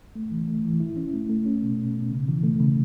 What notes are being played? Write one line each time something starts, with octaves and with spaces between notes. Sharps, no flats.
A3
E3
A3
E3
E4
C#4
A3
A3
C#4
B2
B2
B2
C#3
E3
A3
C#3